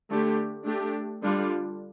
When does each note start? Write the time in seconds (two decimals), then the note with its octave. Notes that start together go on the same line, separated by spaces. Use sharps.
0.10 D3 A3 D4 G4
0.66 A3 D4 G4
1.23 D3 G3 D4 F4